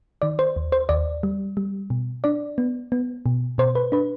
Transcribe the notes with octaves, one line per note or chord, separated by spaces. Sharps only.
D#3 D5
C5
D#2
C5
D#2 D5
G3
G3
B2
D4 D5
B3
B3
B2
B2 C5
B4
D4 B4